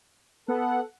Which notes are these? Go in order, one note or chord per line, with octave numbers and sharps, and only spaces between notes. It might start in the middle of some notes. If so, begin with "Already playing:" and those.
B3 A4 F#5